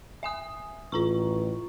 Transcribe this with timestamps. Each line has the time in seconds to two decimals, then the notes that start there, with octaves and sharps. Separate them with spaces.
0.23 E5 G#5 D#6
0.92 A1 F4 A#5 C#6